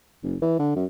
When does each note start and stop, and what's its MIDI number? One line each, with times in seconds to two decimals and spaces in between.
0.23 0.36 30
0.42 0.55 52
0.59 0.73 50
0.76 0.85 42